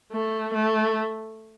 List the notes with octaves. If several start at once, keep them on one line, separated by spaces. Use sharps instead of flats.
A3
A3